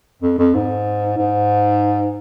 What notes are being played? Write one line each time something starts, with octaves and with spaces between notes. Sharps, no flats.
F2
F2
G#2
G#2